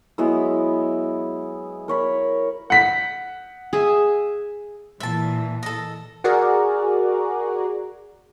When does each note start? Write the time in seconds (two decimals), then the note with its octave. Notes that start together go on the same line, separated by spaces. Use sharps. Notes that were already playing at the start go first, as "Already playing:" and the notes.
0.18 F#3 G#3 B3 E4
1.88 A#4 C#5 B5
2.70 F#5 B6
3.73 G#4 E5
5.00 A#2 E3 E5 A5
5.63 A4 D#5
6.24 F#4 G#4 A#4 D5